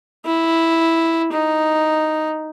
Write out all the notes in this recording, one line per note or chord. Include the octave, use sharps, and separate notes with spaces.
E4
D#4